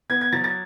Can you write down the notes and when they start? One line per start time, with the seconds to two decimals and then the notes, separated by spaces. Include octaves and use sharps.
0.10 B3 G#6
0.21 G#6
0.33 F#3 A6
0.44 A6